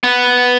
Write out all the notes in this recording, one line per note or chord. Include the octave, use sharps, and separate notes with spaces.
B3